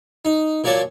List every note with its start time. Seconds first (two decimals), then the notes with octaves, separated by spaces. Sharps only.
0.25 D#4
0.64 A#2 F#3 A#3 C#5 D5 A5